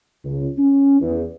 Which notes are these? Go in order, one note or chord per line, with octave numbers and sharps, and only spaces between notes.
C#2
C#4
E2